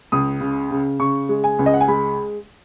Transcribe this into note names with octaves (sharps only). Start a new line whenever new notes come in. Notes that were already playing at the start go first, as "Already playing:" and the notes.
C#2 D#6
C#3
C#3
C#3 C#6
G#3
G#5
C#2
D#5
F#5
G#5
G#3 B5